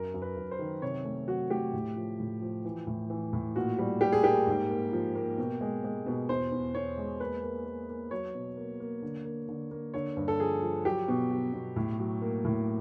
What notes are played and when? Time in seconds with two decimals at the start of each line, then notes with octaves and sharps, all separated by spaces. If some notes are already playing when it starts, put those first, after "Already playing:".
Already playing: F#2 A#4
0.14 F#2
0.22 B4
0.37 F#2
0.51 C5
0.59 D#3
0.82 C3 C#5
1.05 A3
1.28 F#3 F#4
1.50 A3 G4
1.73 A2
1.96 F3
2.20 A2
2.42 F3
2.65 E3
2.87 A2
3.10 E3
3.33 A2
3.56 A#2 F#4
3.78 G3
4.01 G3 G4
4.12 G#4
4.24 A#3 G4
4.47 G#2
4.70 A#3
4.92 F3
5.15 A#3
5.38 B2
5.61 G#3
5.84 G#3
6.06 B2
6.29 E2 C5
6.52 E2
6.75 E2 C#5
6.97 G#3
7.20 A#3 B4
7.43 A#3
7.66 A#3
7.89 A#3
8.11 F#3 C#5
8.35 B2
8.57 A#3
8.80 A#3
9.02 D3
9.25 A#3
9.48 D3
9.71 A#3
9.94 D3 C#5
10.17 G2
10.28 A4
10.39 F3 G#4
10.62 F3
10.85 F#3 G4
11.08 B2
11.31 F#3
11.53 B2
11.76 A2
11.99 F#3
12.22 A#3
12.45 A2